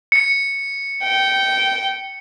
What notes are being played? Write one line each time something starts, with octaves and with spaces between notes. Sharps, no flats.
C#7
G5